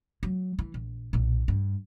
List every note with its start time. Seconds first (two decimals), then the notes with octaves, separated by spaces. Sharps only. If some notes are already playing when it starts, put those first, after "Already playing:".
0.23 F#3
0.59 E3
0.74 A#1
1.13 B1 A#2
1.48 G2